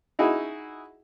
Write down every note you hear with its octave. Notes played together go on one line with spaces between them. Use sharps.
D#4 E4 F#4 G#4